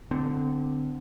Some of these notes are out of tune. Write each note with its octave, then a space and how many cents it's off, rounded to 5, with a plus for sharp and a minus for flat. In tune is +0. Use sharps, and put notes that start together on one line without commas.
D3 +0 C4 -35